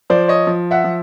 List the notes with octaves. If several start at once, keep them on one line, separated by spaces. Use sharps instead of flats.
F3 C5 D5
C#5 D#5
F3
E5 F#5
F3